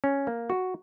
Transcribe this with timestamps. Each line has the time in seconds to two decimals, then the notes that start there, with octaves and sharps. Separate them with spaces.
0.04 C#4
0.27 A#3
0.50 F#4